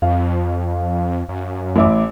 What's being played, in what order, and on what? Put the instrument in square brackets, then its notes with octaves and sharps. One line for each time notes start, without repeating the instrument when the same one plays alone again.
[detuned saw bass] F2 [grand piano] F5
[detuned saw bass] F#2
[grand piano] A1 E4 D6